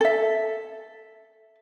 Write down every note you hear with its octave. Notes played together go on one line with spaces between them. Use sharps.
A4 E5